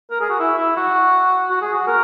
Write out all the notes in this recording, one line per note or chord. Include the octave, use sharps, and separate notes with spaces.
A#4
G#4
F#4
E4
E4
F#4
F#4
G#4
F#4
A#4